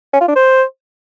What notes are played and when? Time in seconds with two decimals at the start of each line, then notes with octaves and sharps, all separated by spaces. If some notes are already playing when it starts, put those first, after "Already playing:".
0.13 C#4
0.21 F4
0.28 D4
0.36 C5